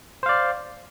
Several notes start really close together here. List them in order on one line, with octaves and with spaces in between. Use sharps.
C5 F5 D5